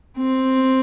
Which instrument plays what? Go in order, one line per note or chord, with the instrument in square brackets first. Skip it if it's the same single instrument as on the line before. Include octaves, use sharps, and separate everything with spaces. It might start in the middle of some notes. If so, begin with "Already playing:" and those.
[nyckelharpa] C4